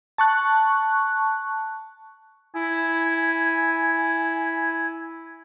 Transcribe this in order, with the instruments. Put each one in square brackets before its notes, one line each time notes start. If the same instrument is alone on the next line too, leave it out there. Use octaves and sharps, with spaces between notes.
[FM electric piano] A5 C#6 F#6
[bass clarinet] E4 [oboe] G#5